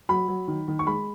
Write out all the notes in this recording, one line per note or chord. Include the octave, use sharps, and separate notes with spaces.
F#3 B5
F#3
D#3
D#3
C#6
G#3 B5